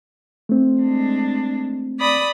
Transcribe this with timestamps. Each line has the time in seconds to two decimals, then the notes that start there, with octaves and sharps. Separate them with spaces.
0.49 A3 C4
0.81 G#3 D4
1.99 D5 B5 D#6